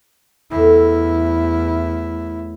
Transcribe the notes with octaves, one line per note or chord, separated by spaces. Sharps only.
E2 A2 E4